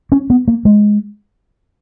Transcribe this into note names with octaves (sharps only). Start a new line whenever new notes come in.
C#4
B3
A#3
G#3